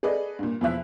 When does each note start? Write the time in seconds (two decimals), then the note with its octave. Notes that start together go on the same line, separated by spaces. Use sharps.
0.03 G#4 A4 B4 D5 D#5
0.39 G2 A#2
0.61 E2 B2 F3 E4 E5 F#6